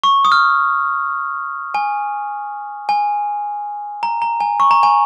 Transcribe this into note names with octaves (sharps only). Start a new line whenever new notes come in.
C#6
D#6
F6
G#5
G#5
A#5
A#5
G#5
C#6
A#5
G#5